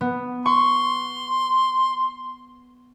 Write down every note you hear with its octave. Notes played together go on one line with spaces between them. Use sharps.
B3
C6 C#6